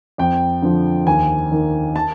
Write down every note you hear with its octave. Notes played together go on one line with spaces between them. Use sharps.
F2 G5
D3 F3
D#2 G#5
D#3
A5